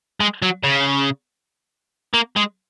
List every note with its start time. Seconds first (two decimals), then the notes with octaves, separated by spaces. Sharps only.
0.20 G#3
0.42 F#3
0.63 C#3
2.14 A#3
2.36 G#3